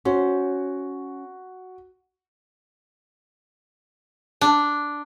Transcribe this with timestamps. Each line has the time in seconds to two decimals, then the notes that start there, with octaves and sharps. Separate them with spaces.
0.05 C#4 F#4 C5
4.41 D4